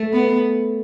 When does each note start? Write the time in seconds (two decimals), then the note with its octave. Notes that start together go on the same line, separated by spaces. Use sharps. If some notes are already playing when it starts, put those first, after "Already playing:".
Already playing: A3
0.13 B3